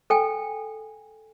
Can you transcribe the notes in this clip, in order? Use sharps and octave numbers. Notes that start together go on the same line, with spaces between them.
A4 G5 G#5